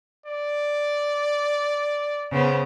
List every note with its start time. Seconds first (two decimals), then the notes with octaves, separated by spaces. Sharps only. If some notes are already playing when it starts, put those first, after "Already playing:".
0.26 D5
2.31 C#3 B3 C5